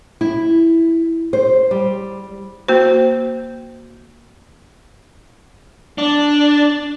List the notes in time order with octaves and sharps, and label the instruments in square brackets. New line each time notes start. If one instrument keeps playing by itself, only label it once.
[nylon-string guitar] E4
C5
G3
[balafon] A#3 F#4 C5
[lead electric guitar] D4